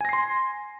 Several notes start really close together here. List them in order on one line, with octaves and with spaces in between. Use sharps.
G#5 A#6 C7 C6